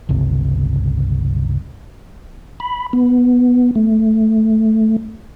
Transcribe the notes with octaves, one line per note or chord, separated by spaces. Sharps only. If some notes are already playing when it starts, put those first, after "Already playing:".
G1 C#2 C3
B5
B3
A3